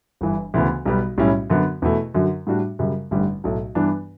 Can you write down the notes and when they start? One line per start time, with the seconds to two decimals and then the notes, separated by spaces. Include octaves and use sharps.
0.21 G1 G2 E3
0.54 D2 C#3 E3 B3
0.85 B1 B2 G3 B3
1.18 B1 A2 G3 C#4 E4
1.50 F#2 D3 F#3 B3 F#4
1.82 E2 B2 A3 E4
2.14 F#2 D3 F#3
2.47 A2 G3 D4 F#4
2.79 F#2 C#3 G3
3.11 A1 G2 D3 G3
3.44 B1 A2 F#3 A3
3.75 G2 E3 B3 D4